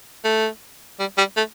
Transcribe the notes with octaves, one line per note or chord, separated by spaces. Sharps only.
A3
G3
G3
A3